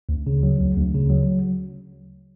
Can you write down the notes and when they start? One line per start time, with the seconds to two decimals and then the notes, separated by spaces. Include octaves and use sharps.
0.09 D2
0.27 C#3
0.43 F#3
0.60 D2
0.77 D2
0.94 C#3
1.10 F#3